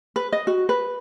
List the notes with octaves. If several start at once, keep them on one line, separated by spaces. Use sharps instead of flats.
B4
D#5
F#4
B4